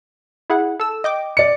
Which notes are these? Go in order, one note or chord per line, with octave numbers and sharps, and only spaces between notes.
E4 G#4 F#5
A4 E6
D#5 G5 D6
D5 C#7